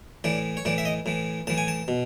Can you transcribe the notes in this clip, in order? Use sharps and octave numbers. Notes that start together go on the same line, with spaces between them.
A2 E3 D5
C#5
A2 E3 D5
E5
D#5
A2 E3
A2 E3 A5
G#5
A5
B2